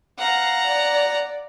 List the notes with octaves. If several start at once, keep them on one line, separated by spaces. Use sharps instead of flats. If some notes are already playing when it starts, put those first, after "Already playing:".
F5 F#5 A#5
D5